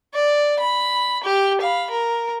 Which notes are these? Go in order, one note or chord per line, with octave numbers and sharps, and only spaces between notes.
D5
B5
G4
F5 B5
A#4